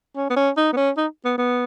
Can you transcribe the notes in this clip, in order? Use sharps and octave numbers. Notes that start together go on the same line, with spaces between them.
C#4
B3
C#4
D#4
B3
C#4
D#4
B3
B3